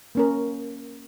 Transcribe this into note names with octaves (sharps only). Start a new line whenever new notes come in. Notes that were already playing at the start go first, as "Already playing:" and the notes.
A#3 C#4 A#4